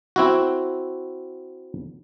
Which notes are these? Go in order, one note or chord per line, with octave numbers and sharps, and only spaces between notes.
C4 E4 F#4